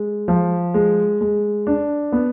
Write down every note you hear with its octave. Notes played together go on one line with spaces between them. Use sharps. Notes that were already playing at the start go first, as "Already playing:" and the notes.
Already playing: G#3
F3
G#3
G#3
D4
B3